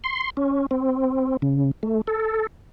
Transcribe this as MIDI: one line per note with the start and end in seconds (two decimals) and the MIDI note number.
0.04 0.30 84
0.37 0.66 61
0.71 1.37 60
1.42 1.71 49
1.83 2.01 57
2.07 2.47 69